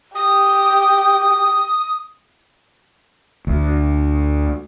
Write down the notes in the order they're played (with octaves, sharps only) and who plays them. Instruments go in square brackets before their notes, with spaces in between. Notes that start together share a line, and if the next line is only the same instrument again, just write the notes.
[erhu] G4 [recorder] D#6
[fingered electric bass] D2